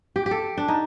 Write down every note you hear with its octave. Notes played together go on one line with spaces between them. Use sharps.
G4
G4
A4
D4
D#4